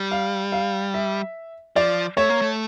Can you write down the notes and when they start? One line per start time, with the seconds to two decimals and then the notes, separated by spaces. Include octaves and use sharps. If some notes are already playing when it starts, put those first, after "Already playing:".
Already playing: G3
0.11 F5
0.52 F5
0.94 E5
1.76 F3 D5
2.17 A3 C#5
2.29 A#3
2.41 A3